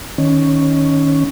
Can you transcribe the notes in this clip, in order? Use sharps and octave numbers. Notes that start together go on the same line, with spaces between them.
D#3 C#4